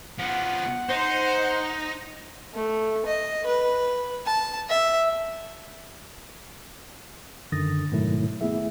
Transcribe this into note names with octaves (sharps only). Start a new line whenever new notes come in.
F3 B3 F#5
D#4 C5
A3
D#5
B4
A5
E5
F#2 D3 D#3 D#6 A6 A#6
G#2 B2 D#3 F#3 A3 E4
A3 B3 E4 G#4 E5